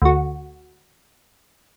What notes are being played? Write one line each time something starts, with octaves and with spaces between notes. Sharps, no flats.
D2 F#4